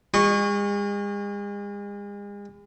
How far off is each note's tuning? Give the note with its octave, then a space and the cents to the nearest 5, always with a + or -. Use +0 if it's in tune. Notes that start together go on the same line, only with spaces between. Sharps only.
G#3 -40 D#5 -30 C#6 -10